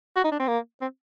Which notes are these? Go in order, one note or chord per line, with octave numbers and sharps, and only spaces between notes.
F#4
D#4
D4
C4
A#3
C4